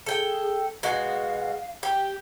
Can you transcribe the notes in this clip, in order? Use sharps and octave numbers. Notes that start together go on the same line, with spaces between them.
G#4 A4 G5
B2 G#3 F#4 F5
G4